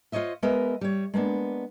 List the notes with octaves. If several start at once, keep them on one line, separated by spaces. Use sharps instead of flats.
F4 C5 C#5 D#5 E5
G#3 B3 A#4 D#5 E5
G3 C#5
G#3 A#3 B3 D4